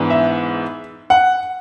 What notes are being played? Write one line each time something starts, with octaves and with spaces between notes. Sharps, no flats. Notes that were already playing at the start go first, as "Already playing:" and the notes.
Already playing: G#2 E3 B3 D4
E5
F#5